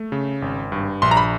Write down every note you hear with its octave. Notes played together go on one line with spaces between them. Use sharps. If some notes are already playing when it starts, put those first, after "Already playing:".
Already playing: A3
C#3
G#1
G2
A#1 C6
A#5
B5